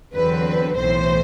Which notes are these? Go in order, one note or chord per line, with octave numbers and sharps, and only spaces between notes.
E2 D3 F#3 C4 B4
B1 A2 E3 C5